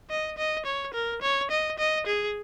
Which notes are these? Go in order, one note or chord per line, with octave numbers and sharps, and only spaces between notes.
D#5
D#5
C#5
A#4
C#5
D#5
D#5
G#4